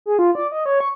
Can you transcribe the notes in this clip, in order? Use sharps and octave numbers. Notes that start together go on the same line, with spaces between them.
G#4
F4
D5
D#5
C#5
C#6